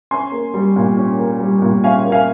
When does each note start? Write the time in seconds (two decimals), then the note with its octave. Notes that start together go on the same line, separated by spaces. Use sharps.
0.11 C#4 G#5 C6
0.32 A#3
0.54 G3
0.76 A#2
0.97 C#4
1.19 A#3
1.40 G3
1.62 A#2
1.84 C#4 F5 G#5
2.05 A#3
2.12 F5 G#5